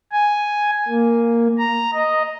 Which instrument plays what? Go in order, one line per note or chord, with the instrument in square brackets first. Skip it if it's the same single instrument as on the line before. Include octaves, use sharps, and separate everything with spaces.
[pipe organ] G#5
A#3
A#5
D#5